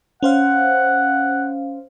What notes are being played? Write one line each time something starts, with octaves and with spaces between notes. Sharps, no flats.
C#4 C5 F5 F#5